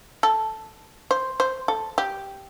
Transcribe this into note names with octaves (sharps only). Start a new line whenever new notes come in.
A4
C5
C5
A4
G4